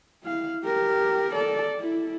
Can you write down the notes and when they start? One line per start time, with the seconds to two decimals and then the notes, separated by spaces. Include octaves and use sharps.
0.24 E4 F5
0.65 G4 A#4
1.34 A4 D5
1.79 E4